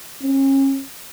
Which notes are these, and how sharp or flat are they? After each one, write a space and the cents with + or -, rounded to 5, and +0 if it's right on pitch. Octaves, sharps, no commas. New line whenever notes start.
C#4 -35